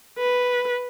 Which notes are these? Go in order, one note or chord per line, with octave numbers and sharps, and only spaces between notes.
B4